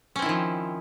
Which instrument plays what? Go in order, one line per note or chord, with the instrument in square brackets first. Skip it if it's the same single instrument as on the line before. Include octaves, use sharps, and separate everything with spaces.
[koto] C#4
C4
E4
D#3
F3